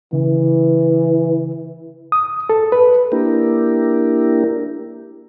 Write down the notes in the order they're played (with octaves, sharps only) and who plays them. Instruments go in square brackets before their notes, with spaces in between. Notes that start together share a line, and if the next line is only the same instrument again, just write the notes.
[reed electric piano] C#3 [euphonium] E3
[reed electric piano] D#6
A4
B4
[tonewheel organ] A#3 D4 E4 G4 A#4